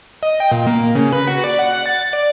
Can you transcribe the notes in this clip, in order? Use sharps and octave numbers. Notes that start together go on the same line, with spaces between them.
D#5
G5
A#2
A#3
C#3
B4
F#4
D5
F#5
F#5
A6
D5